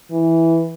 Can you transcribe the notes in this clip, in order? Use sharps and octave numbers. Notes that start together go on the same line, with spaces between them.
E3